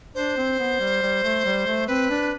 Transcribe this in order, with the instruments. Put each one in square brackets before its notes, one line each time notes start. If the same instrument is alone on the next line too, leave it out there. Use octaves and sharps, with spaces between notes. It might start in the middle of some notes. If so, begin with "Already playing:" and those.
[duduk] D4 [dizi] C5
[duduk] C4
B3
G3
G3
A3
G3
A3
[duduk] C4 [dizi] B4
[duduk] D4